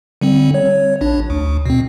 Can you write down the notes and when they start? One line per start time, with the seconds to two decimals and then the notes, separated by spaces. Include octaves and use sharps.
0.21 D3 G3 C4
0.54 C#5
1.01 A#1 D4
1.30 D2
1.66 B2 C4